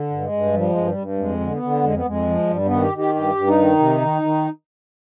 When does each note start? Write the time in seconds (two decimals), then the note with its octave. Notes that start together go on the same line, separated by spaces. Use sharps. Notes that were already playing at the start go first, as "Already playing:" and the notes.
Already playing: D3
0.10 G2
0.21 G#3
0.32 G2
0.54 F3 G3
0.70 G#3
0.75 G2
0.86 G3
0.97 G2
1.19 F2 G#3
1.40 D3
1.51 B3
1.63 D3
1.83 F2 G#3
1.95 B3
2.05 F2 G#3
2.27 F3
2.49 G2 G3
2.66 B3
2.71 D#3
2.82 G4
2.93 D#3 G4
3.15 G2 G4
3.35 G2
3.47 D#4
3.58 D#3
3.79 C3
4.00 D#3
4.22 D#3